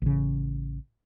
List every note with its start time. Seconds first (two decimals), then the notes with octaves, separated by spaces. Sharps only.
0.02 A1 C#3